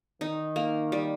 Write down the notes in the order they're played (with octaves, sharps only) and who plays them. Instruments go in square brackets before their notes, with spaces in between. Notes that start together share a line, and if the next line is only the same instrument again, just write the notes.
[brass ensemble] D#3 [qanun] D#4
[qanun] A#3
G3